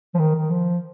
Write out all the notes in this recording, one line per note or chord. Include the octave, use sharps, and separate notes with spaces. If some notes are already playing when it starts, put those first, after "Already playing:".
F3
D#3
D#3
F3